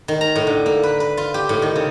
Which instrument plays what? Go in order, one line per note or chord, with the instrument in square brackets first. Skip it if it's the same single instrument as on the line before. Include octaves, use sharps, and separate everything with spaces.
[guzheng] D#3
A#5
A2
D3
A#3
B4
B4
F4
G4
A2
D#3
C#3